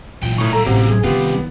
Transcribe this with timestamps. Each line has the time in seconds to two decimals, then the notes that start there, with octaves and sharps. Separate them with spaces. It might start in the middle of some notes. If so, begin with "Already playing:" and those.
0.23 E2 A#2 F#3 G5
0.38 A2 F3 D#4 C#6
0.53 G3 A#3 A4 A#5
0.66 A1 C3 F#4
0.87 G#4
1.04 C2 D#3 B3 F4 G4